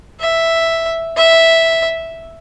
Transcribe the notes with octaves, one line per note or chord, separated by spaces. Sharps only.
E5
E5